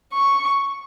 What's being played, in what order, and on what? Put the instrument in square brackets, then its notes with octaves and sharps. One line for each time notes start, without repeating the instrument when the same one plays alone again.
[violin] C#6